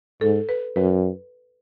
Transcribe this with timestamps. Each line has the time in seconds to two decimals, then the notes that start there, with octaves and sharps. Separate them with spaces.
0.21 G#2 A4
0.49 B4
0.76 F#2 B4